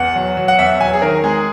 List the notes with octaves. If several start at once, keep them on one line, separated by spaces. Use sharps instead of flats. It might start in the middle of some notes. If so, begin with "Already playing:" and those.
Already playing: E2 F#5
F#3
F#3
F#5
E2 E5
F#3 G#5
G#4
D#3 A#4
G#3 G#4